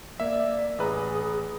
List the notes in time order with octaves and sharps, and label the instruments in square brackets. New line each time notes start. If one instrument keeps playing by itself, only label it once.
[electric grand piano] A#3 E5 [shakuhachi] D5
[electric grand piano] A1 B4 A#5 [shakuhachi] G#4